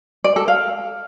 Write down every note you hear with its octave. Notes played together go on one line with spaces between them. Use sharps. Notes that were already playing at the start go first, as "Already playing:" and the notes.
D5
A4
F5